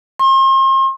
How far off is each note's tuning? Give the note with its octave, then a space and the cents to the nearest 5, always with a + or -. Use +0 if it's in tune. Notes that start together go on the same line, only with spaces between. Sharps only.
C6 +40